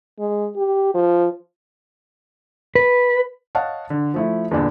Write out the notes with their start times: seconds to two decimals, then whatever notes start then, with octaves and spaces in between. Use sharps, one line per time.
0.19 G#3
0.56 G4
0.94 F3
2.75 B4
3.55 C#5 D#5 F5 F#5 A5
3.90 D3
4.14 F3 A3 E4
4.51 E2 G2 A#2 D3 D4